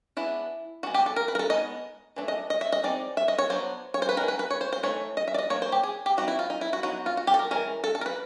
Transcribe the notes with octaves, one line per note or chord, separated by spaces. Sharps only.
G#3 B3 D4 E4
G#3 B3 D4 F#4
G4
A4
A#4
B4
A#4
A4
G#3 B3 D#4 D#5
E3 A3 D4
D#5
D#5
E5
D#5
G#3 C4 D#4 D5
E5
D#5
C#5
F#3 B3 D4 C5
C#5
C5
B4
D#3 G#3 C#4 A#4
B4
B4
C#5
C5
C5
E3 A3 D#4 C#5
D#5
E5
D5
D#5
F#3 A#3 D4 C#5
C5
G4
G#4
G4
G3 C4 D#4 F#4
E4
F4
D#4
E4
F#4
F#3 B3 D#4 F#4
F4
F#4
G4
A4
A#4
E3 G#3 C#4 A#4
A4
A4
A#4
B4